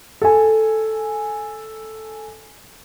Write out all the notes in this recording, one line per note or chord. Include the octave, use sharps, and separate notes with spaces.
A4 G#5